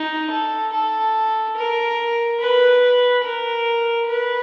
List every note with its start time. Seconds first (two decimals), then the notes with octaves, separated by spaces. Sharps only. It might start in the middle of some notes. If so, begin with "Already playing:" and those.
Already playing: D#4
0.31 A4
0.72 A4
1.56 A#4
2.40 B4
3.24 A#4
4.08 B4